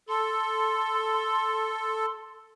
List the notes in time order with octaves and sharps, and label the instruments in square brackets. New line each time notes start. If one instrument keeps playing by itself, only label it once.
[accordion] A4 [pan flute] C6